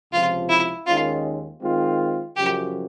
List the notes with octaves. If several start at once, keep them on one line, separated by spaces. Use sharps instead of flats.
C#2 C3 F3 F4
E4
D#2 D#3 G#3 C#4 F4
D#3 G#3 C4 F4
F#2 C#3 F3 G4